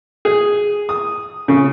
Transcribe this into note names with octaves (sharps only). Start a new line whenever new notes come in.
G#4
D#6
C#3